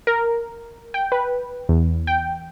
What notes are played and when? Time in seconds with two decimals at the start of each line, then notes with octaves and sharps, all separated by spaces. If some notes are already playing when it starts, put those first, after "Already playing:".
0.07 A#4
0.94 G5
1.12 B4
1.69 E2
2.07 G5